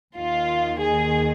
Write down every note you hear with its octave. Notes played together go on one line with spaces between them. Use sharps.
D#2 D#3 F4
G#4